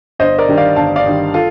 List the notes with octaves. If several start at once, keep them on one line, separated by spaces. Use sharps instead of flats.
G1 C5 D#5
A#4 D5
G2 D#3 G3
D5 F5
G1 F5 A5
D5 F5
G2 D#3 G3
F4 A4